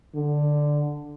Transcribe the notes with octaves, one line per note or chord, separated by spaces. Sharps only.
D3